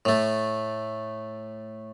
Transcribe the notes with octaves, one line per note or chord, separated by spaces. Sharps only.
A2 A3